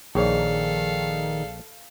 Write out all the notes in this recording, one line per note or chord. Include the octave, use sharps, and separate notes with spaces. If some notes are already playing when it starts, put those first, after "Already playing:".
A#1 D#3 G#4 A4 C#5 D5 F5